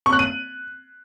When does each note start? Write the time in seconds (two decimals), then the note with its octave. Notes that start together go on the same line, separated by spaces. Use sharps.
0.06 C#6
0.13 F#6
0.19 D#7